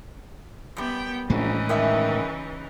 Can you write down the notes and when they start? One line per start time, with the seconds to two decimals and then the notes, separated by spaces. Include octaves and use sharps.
0.77 F#2 G3 B3 G5
1.30 A#1 A2 C#3 E3 G#3 D#4
1.69 G2 D#3 C#4 E5